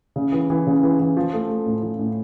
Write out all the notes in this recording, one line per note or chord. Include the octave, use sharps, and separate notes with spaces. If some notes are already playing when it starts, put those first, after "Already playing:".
C#3
E3
E3
C#3
E3
E3
F3
A3
A3
A2
F3
A2